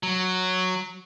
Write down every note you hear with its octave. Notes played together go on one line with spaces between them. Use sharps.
F#3